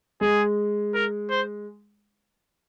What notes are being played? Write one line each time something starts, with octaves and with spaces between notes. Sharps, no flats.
G#3 G#4
A#4
C5